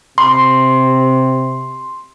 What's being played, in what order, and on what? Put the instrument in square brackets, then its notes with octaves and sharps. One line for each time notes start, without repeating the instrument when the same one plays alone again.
[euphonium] C3 [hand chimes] C6